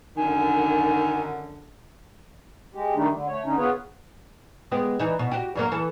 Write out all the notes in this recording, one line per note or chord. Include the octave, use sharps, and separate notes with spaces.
F#2 D3 D#3 G#5
G#3 G4
D#3 G3 A3 D4 D#4
D3
A3 C#5
D3 C#4 D#4
B3 F4 G#4 B4 C#5
G#3 B3 G4
E3 D#4
B2
F#4 G4
G2 F#3 A#3
E3 A4